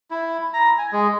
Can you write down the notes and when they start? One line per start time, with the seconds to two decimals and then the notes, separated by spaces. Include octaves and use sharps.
0.11 E4
0.54 A#5
0.78 G#5
0.92 G#3